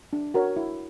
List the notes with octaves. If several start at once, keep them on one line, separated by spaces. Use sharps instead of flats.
D4
F#4 A#4 C#5
E4